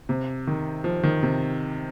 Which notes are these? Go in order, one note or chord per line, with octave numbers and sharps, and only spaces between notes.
C3
D#3
F3
D#3
C3